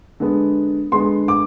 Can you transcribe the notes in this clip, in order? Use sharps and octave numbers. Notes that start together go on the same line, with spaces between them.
D3 G#3 B3
D3 G#3 B3 C6
D6